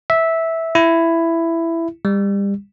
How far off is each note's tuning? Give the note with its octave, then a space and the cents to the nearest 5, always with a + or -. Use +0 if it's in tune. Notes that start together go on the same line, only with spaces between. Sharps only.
E5 -10
E4 +10
G3 +30